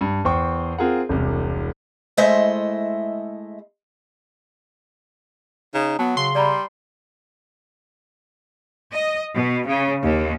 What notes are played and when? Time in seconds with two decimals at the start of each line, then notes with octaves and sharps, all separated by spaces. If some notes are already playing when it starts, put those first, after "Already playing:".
0.01 G2
0.25 E2 C5 G5 C#6
0.78 C4 F4 G#4 A#4 F#5
1.09 E1 C2 C3
2.17 G#3 A3 E4 C5 D#5 E5
5.74 C#3 D#4
5.99 F#3 B3 A5
6.17 C#3 C6
6.35 G3 D5 A#5 B5
8.91 D#5
9.34 B2
9.66 C#3
10.03 D#2